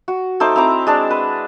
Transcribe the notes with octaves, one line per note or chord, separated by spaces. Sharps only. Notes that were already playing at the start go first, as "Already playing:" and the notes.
F#4
A3 D#4 C5 D6
C4 E4 A#5 D6
G#3 D4 A5
B4